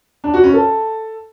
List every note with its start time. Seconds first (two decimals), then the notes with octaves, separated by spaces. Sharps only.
0.24 D4
0.34 F#4
0.44 C#4
0.54 A4